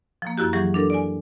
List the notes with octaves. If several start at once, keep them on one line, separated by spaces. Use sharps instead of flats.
F3 A#3
F#2 E4 F#4 G4
E3 F#3 G4 G#4 C#6
D4 A4 A#4
D5 G#5